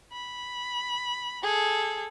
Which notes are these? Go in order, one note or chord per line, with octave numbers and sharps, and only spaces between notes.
B5
G#4 A4